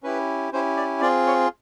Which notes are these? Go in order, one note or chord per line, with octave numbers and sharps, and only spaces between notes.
C#4 E4 G4 B4
C#4 E4 G4 C5
D5
C4 F4 G#4 D5
C#5